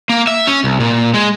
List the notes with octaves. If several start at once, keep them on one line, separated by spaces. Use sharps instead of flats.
A#3
E5
C#4
C2
A#2
G#3